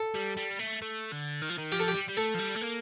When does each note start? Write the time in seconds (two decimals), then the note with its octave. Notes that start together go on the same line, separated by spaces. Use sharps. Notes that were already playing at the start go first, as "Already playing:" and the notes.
Already playing: A4
0.14 G3
0.37 G3
0.59 A3
0.82 A3
1.12 D3
1.42 D#3
1.50 F3
1.58 D#3
1.72 F3 G4
1.80 A4
1.88 G4
1.94 G3
2.08 G3
2.17 A3 A4
2.34 F3
2.39 G3
2.56 A3
2.62 A#3